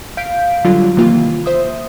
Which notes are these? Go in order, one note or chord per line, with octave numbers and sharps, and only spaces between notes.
F5 G6 B6 D7
D3 F#3 G3 F4
C3 D#3 E3 A#3 F4
C5 E5 D#6